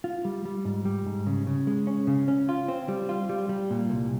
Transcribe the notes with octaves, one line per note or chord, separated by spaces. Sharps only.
F4
G3
G3
G#2
G3
G#2
C#3
C#3
G#3
C#4
C#3
C#4
F4
C4
G3
F4
G3
G3
A#2
C2